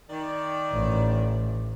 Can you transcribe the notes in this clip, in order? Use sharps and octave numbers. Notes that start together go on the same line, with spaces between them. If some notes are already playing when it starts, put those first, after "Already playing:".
D#3 D5
A1